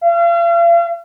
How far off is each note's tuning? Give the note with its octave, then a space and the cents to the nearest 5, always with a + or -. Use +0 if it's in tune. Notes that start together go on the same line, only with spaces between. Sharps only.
F5 -40